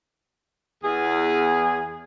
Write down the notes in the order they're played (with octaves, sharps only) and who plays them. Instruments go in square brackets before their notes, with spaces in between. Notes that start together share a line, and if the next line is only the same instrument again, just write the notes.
[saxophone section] E2 G#4